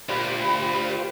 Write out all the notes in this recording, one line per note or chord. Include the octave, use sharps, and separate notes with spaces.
D2 F4 G4 A#4 C5 D5 B5